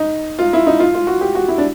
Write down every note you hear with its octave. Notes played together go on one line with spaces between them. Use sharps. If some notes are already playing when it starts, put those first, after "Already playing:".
Already playing: D#4
F4
E4
D#4
F4
F4
F#4
G4
F#4
E4
D4